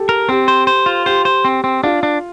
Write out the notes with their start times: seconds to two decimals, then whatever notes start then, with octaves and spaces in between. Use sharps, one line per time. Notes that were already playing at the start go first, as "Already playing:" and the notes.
Already playing: G4 A4
0.09 A#4
0.29 C4 G4
0.48 C5
0.67 C5
0.86 F4
1.06 G4 C5
1.25 C5
1.45 C4
1.64 C4
1.84 D4 F4
2.03 D4